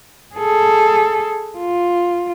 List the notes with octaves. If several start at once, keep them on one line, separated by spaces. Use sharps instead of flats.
G#4 A4
F4